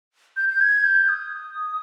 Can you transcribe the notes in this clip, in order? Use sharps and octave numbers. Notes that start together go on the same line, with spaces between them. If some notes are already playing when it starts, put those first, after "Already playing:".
G6
G6
G#6
G6
D#6